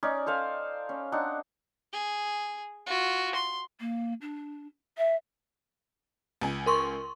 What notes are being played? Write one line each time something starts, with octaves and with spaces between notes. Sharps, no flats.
C#4 D#4 D5
A4 C5 F5 G#5
C#4
C4 D4 D#4 F#5
G#4
F4 F#4
C6
A#3
D4
E5
C#2 G#5
A#4 C6 C#6